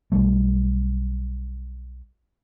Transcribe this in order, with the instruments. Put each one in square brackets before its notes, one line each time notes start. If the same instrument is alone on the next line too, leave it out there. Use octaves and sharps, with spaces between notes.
[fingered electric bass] B1 G3 A3